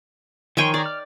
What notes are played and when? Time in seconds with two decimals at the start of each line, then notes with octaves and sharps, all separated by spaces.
0.57 D#3 F3 C#5 G5 G#5 C6
0.74 G#4 A#4 D5
0.86 F6